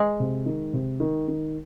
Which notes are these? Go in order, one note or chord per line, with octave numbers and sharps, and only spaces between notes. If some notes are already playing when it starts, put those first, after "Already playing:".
Already playing: G#3
C3
D#3
C3
D#3
D#3